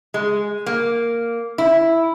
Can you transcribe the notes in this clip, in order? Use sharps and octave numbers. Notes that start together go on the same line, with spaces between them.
G#3
A#3
E4